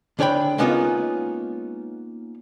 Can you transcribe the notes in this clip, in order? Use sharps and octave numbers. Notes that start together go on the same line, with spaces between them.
D2 D4 C#5 G5 B5
G#3 A#3 B3 C#4 D#4 F4